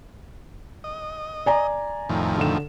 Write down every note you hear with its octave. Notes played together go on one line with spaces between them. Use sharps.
D#5
D5 G#5 A#5
F2 A2 D#3
D3 E7